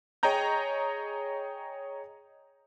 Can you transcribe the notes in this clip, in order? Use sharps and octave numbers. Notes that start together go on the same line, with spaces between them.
G#4 C#5 D#5 G5 A#5 G6